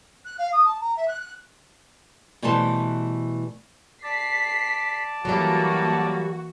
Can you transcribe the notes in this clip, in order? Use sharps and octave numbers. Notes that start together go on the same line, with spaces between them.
F#6
F5
D#6
A5
A#5
E5
F#6
F#6
B2 E3 G3 A3 C5 A5
D5 A5 B6 C7
E3 F#3 G3 A#3 F#4 A4